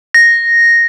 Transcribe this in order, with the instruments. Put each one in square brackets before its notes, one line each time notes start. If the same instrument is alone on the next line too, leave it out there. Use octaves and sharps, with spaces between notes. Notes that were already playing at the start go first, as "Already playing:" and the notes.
[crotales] A#6